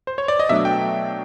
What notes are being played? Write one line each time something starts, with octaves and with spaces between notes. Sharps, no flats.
C5
C#5
D5
D#5
B2 F#3 A3 D4 E5
G5